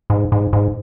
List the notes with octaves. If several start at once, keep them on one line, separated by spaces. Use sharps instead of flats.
G#2
G#2
G#2